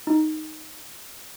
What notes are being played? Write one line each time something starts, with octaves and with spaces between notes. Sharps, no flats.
D#4